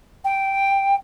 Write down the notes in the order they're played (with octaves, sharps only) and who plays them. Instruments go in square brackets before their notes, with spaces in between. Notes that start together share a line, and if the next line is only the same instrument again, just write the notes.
[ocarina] G5